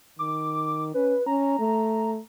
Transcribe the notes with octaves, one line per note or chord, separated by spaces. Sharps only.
D#3 D6
C#4 B4
C#4 A#5
A3